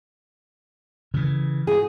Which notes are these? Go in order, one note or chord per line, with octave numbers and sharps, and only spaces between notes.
C#3 E3
D#4 F#4 G#4